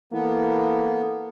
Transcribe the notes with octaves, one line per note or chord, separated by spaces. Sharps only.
E3 A#3 B3 A4